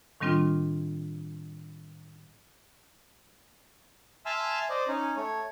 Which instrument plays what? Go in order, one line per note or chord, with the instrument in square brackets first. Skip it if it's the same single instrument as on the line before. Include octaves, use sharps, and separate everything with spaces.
[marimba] A2 D#3 G3 C4 D4 F4
[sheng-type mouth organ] E5 G#5 A5 C6 E6 F6
C5 D5 D#5
C#4 D#4
A3 C#5